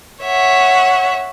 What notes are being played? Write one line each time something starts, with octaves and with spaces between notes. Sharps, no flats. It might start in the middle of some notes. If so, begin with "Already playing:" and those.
C#5 E5 F#5